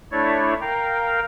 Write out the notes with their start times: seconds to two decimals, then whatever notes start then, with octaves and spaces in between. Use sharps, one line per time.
0.12 A3 D4 E4 C#5 D5
0.61 A#4 F5 G5